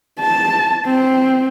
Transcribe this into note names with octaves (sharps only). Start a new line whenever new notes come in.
A5
C4